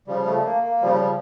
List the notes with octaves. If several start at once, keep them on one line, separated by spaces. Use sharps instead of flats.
C#3 F3 G3
A3
A#3
A#3
C#3 F3 G3
G3